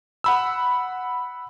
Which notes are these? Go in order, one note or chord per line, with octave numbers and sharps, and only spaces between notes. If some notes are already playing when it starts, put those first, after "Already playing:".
F#5 B5 E6